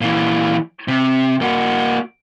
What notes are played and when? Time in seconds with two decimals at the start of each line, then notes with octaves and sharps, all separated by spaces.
0.01 A#2 E3
0.88 C3
1.42 A#3 F#4